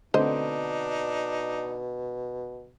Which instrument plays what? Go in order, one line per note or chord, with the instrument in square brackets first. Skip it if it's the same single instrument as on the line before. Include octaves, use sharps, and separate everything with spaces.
[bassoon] B2 [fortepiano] D3 A3 C4 [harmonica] D4 D#4 [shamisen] C5 D#5